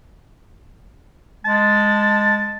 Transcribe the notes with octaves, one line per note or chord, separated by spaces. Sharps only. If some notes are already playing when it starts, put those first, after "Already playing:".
G#3 A5